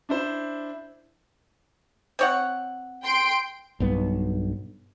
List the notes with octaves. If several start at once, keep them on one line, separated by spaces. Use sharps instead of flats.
D4 E4 C5
C4 C#5 F#5
G5 C6 D7
B1 G2 B3